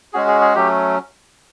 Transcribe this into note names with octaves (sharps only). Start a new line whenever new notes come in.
G#3 C#4 F#4 G#4
G#4
G#4
F#3 A3 C#4 G4